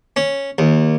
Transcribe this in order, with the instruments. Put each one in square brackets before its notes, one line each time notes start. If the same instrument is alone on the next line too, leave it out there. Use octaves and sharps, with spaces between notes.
[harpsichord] C#4
D#2